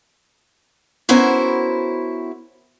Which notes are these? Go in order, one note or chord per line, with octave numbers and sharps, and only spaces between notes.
B3 C#4 E4 F#4 A#4 C5